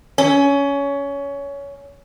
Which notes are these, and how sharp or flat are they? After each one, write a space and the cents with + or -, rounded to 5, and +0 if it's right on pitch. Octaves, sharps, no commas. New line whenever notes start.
C#4 +20